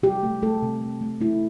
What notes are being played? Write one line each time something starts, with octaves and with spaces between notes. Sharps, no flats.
C3 G4
A3
A3 A4
C3
A3
A3
A3 E4